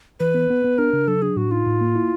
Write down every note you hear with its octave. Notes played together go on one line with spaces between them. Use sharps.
E3 B4
B3
B3
B3
D4 A#4
C#3
F#3 A4
D4 G#4
A2 F#4
D#4 F4
A2
A#3
E4